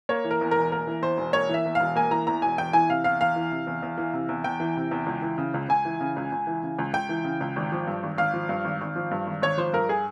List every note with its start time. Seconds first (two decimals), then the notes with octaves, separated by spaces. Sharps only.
0.09 A#3 C#5
0.25 E3
0.31 A#4
0.41 E2
0.51 E1 A#4
0.72 A#3 A#4
0.87 E3
1.02 E2 C5
1.18 E1
1.33 A#3 C#5
1.49 E3 E5
1.65 E2
1.75 E1 F5
1.96 A#3 G#5
2.11 E3 A#5
2.27 E2 A#5
2.42 E1 G#5
2.58 E2 G5
2.73 E3 G#5
2.89 C3 F5
3.04 E2 F5
3.21 E2 F5
3.36 E3
3.51 C3
3.67 E2
3.82 E2
3.98 E3
4.13 C3
4.29 E2
4.44 E2 G5
4.60 E3
4.76 C3
4.91 E2
5.06 C#2
5.22 E3
5.38 C#3
5.54 C#2
5.69 C#2 G#5
5.85 E3
6.00 C#3
6.16 C#2
6.32 C#2
6.47 E3
6.63 C#3
6.78 C#2
6.93 C#2 G5
7.09 E3
7.24 C#3
7.41 C#2
7.56 G#1
7.72 F3
7.87 G2
8.03 G#1
8.18 G#1 F5
8.33 F3
8.49 G2
8.65 G#1
8.81 G#1
8.96 F3
9.11 G2
9.27 G#1
9.42 G#1 C#5
9.57 F3 C5
9.73 G2 A#4
9.89 G#4